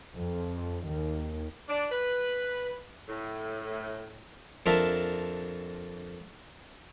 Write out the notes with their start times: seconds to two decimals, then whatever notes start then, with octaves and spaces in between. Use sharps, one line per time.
0.14 F2
0.85 D#2
1.69 D4
1.91 B4
3.09 A2
4.66 F2 D4 F4 A#4 E5 A5